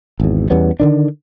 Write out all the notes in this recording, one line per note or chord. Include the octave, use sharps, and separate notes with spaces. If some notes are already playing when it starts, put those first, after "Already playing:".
G#1 E2
E2 G3 B3 C#4
D3 D#3 D4